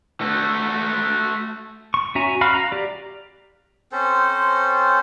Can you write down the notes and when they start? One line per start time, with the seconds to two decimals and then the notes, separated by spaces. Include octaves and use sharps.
0.21 A3 F#4
1.94 C#6
2.15 C#4 F#4 E5 G#5 A#5
2.41 F#4 F5 B5 F6
2.54 A#5
2.72 G4 D5
3.92 C4 C#4 A4 C5